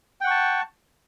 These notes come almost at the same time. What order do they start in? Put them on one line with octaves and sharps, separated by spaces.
G5 F#5 C#6 A5